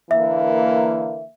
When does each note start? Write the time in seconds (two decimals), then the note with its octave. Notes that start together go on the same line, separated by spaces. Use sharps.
0.11 D3 E3 A#3 E5